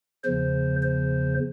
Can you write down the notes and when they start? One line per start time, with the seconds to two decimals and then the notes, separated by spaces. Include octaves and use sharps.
0.24 E2 C#3 F3 C5
0.83 C5